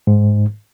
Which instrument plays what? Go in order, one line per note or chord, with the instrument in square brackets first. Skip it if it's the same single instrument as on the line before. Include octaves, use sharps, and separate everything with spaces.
[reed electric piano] G#2